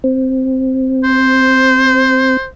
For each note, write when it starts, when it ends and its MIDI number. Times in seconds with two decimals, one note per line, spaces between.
0.04 2.37 60
1.04 2.47 72